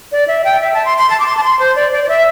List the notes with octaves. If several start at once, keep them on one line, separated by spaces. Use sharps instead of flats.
D5
E5
G5
E5
A5
C6
C6
A5
D6
C6
A5
C6
C5
D5
D5
D5
E5